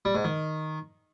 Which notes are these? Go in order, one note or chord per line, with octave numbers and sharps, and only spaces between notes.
G3
G#2
D#3